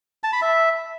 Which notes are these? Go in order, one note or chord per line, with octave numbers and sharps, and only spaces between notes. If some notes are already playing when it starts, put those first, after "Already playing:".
A5
B5
E5